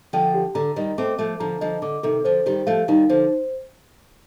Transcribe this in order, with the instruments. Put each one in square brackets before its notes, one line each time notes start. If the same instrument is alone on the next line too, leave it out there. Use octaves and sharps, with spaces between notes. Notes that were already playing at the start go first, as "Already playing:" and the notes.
[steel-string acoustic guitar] D3 F3 [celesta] G5
[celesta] G4
[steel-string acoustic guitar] D3 [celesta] A#5
[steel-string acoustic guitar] D#3 G3 [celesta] D#5
[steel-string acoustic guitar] A3 C4 [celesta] D6
[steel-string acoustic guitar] F3 A3 [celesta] A4
[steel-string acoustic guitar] D3 F3 [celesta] A#5
[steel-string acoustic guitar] D3 F3 [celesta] D#5
[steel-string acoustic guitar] D3 [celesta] D6
[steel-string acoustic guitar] C3 D#3 [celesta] A4
[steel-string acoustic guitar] D3 F3 [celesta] C5
[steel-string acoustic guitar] D#3 G3 [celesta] G4
[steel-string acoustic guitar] F3 A3 [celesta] F5
[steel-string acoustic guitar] D#3 G3 [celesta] D#4
[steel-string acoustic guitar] D3 F3 [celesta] C5